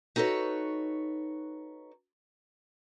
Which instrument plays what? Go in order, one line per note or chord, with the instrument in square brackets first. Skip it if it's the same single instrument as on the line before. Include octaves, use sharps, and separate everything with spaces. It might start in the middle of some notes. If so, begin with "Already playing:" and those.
[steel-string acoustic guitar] D#4 F#4 A4 B4 C#5